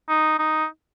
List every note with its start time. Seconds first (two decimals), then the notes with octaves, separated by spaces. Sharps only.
0.09 D#4
0.39 D#4